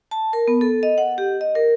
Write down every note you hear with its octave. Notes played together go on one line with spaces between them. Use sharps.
A5
A#4
B3
A4
D#5
F#5
G4
D#5
A#4